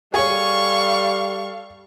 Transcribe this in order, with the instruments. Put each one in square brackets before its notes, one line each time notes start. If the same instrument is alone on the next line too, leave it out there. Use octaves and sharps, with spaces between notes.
[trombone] G3 [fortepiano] G#4 C#5 [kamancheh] A4 F5 [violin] C#6